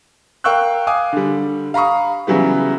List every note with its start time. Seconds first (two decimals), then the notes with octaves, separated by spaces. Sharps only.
0.44 A#4 F5 G5 C#6 E6 F#6
0.87 F5 G#5 D6 D#6
1.13 D3 G3
1.74 F5 A#5 B5 C#6 D#6
2.27 C#3 E3 F#3 G3 B3